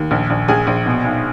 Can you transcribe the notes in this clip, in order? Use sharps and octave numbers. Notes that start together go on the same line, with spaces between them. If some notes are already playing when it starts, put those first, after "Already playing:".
Already playing: D#2
A#1
A#1
A#1 G#4 G#5
A#1
B2
B1